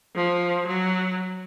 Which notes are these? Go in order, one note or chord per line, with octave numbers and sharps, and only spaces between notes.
F3
F#3